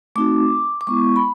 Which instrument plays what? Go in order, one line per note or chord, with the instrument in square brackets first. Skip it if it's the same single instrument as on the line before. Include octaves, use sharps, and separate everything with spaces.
[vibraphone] A3 C4 D#4 F#4 D6
D6
G#3 B3 E4 C#6
B5